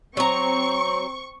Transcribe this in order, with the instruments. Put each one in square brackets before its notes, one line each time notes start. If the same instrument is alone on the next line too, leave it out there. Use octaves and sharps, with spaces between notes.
[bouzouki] F#3 A#5 [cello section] C4 [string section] C#6